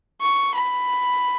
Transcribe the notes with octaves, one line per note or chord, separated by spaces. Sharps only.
C#6
B5